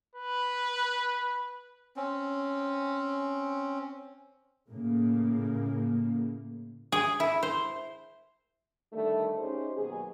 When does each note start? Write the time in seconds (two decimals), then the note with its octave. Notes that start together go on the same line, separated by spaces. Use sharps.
0.16 B4
1.96 C4 C#4
4.68 A2 C#3 A#3
6.92 G#4
7.20 E4
7.43 C5
8.93 D3 D#3 G3 A3
9.38 C#4 D#4 G4 G#4 C5
9.77 D#2 B2 F#3 G#4